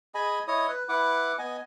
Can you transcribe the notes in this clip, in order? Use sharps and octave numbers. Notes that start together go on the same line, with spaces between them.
G#4 D#5 G#5 B5
E4 C#5 D#5 D#6
B4
E4 B4 F#5 D6
B3 D#5 G#5